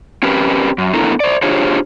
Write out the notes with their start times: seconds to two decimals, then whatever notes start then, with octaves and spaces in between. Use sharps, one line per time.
0.23 C4 C#4 G4 A#4 B4
0.78 F#2
0.93 A3 B3 D4 E4 A4 A#4
1.20 C5 D5
1.42 D4 F4 G4 G#4 C5 C#5